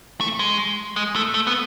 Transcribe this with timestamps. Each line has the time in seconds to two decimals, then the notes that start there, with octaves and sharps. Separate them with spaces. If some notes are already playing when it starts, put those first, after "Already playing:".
0.21 A3
0.39 G#3
0.96 G#3
1.15 A3
1.34 A3
1.47 B3